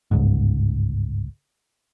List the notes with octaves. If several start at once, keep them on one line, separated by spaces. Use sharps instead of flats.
G1 C#2 G#2